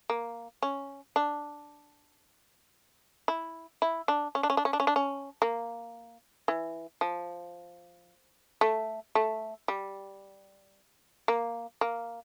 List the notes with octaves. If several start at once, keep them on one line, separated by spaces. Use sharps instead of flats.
A#3
C#4
D4
E4
E4
D4
C#4
D4
C#4
D4
C#4
D4
C#4
D4
C#4
A#3
E3
F3
A3
A3
G3
A#3
A#3